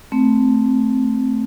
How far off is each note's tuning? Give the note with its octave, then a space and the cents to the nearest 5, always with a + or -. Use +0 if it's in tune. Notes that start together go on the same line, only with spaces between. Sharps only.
A3 +0 C4 +0